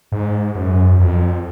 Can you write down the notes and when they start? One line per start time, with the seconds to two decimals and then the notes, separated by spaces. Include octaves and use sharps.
0.12 G#2
0.55 F#2
0.99 F2